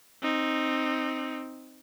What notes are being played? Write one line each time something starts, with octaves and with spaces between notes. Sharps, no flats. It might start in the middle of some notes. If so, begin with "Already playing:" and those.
C4 D#4